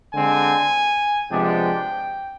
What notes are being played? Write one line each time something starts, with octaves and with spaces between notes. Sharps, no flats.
D3 G#3 C4 G#5
C3 F3 G#3 B3 D4 G5